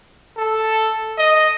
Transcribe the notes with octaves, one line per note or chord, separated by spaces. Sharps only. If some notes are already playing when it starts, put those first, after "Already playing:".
A4
D#5